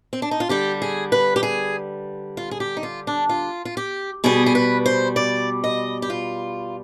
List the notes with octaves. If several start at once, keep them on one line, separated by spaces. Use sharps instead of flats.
C4
D4
D#4
F4
D3 G3 G4
G#4
B4
G4
G#4
F4
G#4
G4
D#4
F4
D4
F4
F4
G4
B2 G3 G#4
G#4
B4
C5
D5
D#5
G4
F4